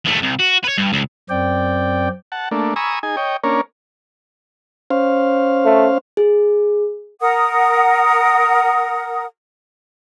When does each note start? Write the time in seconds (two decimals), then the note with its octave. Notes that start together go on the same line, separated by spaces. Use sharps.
0.05 D#2 A3
0.22 C2
0.39 F#4
0.64 B4 C#5
0.78 G2
0.93 C#2
1.30 F#2 C4 D5 G5
2.32 F#5 A5
2.51 A3 A#3 D4
2.76 G#5 A#5 B5 C#6 D#6 E6
3.03 D#4 G#4 G#5
3.17 C#5 D#5 G5
3.44 A#3 C#4 D4 A#4 C#5
4.91 C#4 C5 F5
5.65 A3
6.17 G#4
7.21 A#4 F#5 D#6